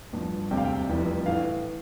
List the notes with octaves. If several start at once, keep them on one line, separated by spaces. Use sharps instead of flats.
A1 G2 F3
E1 D2 C3 G3 C4 G5
F5
G5
F1 F2 E3 G3
A2 E3 F5